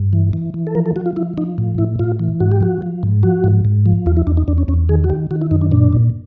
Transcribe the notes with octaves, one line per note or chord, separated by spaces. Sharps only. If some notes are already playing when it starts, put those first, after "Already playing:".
Already playing: G2
E3
E3
E3
A4
F3 A#4
A4
F3 F#4
F4
F3 E4
F3 D#4
A2
A2 E4
A2 F4
E3
G#2 F#4
G4
F3 F#4
F3
G#2
F3 F#4
G#2
G#2
F3
E2 F4
E4
E2 D4
D#4
E2 D4
C#4
E2 C#4
D#3 G#4
F#4
D#3 G4
D#3 F#4
E4
F#2 D#4
D4
A#2 D4
A#2